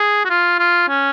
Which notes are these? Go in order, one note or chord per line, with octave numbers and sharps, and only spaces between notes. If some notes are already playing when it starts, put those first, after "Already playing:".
Already playing: G#4
F#4
F4
F4
C#4